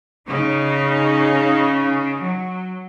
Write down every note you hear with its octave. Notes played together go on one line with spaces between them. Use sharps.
C#3 C#4 D#4
F#3